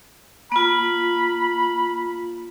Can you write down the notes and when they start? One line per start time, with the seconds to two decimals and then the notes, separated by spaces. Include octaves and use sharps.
0.52 A#3 F4 B5